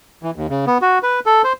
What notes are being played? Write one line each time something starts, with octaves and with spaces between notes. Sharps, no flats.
E3
D#2
C#3
B3
F#4
B4
A4
C5